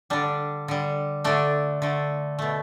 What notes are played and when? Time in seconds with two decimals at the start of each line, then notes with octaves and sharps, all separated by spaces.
0.10 D3 G3 D4
0.68 D3 G3
1.24 D3 A3 D4
1.82 D3 A3
2.39 B2 A3